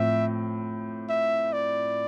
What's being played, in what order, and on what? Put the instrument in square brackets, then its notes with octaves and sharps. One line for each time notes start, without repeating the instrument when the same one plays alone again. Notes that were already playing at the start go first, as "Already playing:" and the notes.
Already playing: [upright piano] A2 F3 C4 [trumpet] E5
[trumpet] E5
D5